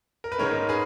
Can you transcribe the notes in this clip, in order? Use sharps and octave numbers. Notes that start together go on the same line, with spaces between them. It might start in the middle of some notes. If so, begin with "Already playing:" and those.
A#4
B4
G#2 D#3 G#3 C#4 A#4 C#5
G#4 B4